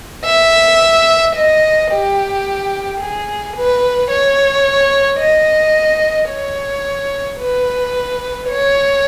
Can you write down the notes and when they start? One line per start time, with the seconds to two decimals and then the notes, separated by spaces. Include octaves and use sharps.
0.26 E5
1.35 D#5
1.91 G4
3.00 G#4
3.56 B4
4.10 C#5
5.20 D#5
6.30 C#5
7.40 B4
8.50 C#5